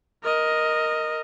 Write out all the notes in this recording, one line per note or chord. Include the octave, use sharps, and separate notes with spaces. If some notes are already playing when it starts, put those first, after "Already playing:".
A#4 D#5